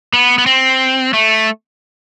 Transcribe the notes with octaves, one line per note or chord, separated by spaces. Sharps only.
B3
B3
C4
A3